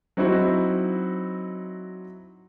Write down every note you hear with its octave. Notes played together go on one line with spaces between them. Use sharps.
F#3 C4 D#4 E4 F#4